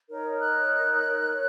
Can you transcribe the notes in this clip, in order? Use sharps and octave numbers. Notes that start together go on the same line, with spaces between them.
D#4 A#4 C#5
F#6
A#4 C#5